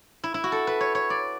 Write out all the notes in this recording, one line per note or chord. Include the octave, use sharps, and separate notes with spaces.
E4
E4
F#4
A4
B4
C#5
C#5
D5